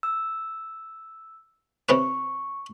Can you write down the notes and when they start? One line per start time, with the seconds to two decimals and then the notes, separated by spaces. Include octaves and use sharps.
0.03 E6
1.89 C3 C#4 B4 C#6